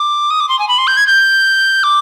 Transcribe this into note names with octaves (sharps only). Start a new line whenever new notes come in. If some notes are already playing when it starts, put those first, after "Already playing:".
Already playing: D6
D#6
D6
C6
G#5
B5
C6
G6
G#6
G6
D6